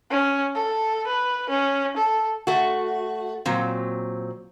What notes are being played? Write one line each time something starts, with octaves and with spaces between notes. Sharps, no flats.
C#4
A4
B4
C#4
A4
A3 F#4
A#2 F#3 C4